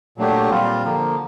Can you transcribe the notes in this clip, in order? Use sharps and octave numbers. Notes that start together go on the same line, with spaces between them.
A#2 F#3 A3 D4 G4
A#2 G3 C4 F4
D3 F3 A#3